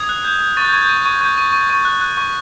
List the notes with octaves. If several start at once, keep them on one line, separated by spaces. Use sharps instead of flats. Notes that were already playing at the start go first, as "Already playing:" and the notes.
Already playing: D#6 G#6
F#6
G6
G6
C#6 A6
G6
C#6 G#6
G6
C#6
C#6
C#6 G6
C#6
C#6
C#6
F#6
F#6
C#6